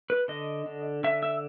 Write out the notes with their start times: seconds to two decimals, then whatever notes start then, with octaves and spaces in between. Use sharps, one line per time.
0.10 B4
0.28 D3 D#5
0.66 D3
1.04 D3 E5
1.23 E5